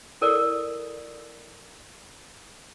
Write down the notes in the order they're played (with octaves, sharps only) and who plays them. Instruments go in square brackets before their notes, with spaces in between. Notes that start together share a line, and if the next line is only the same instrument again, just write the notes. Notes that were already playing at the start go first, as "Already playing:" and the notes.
[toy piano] E4 A4 A#4 D5